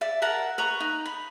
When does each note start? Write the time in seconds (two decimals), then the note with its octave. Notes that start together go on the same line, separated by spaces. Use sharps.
0.01 D5 E5
0.22 A#4 E5 F#5 A5
0.58 B4 A#5 C#6
0.80 D#4
1.05 B5